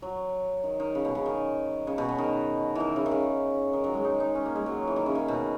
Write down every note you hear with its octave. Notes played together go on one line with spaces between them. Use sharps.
F#3
D#3
D#3
C#3
B2
C#3
D#3
C#3
B2
B2
D#3
D#3 E3
C#3
D#3
C#3
D#3
F#3
G#3
D#4
D#4
C#4
A#3
G#3
F#3
E3
D#3
C#3
D#3
B2